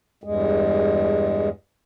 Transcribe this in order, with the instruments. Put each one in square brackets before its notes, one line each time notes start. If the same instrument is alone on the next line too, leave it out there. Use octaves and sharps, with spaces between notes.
[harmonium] E2 G2 G#3